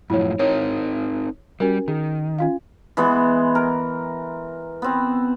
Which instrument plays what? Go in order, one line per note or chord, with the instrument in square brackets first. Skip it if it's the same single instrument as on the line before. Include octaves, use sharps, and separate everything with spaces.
[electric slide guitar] F#2 A2 F3 [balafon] E4 C#5
[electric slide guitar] C4 D#4 A#4 [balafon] C#5
[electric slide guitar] G3 [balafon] C#4 F#4 A#4
[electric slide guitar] D#3 [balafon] G#4
[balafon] C#4 F4 F5
[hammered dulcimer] E3 G#3 B3
A#4
B3 C4